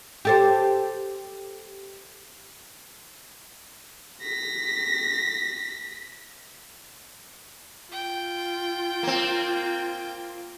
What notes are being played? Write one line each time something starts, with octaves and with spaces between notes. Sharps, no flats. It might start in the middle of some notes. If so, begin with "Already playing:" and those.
G4 A4 C5
A#6 B6
F4 G5
A#3 C4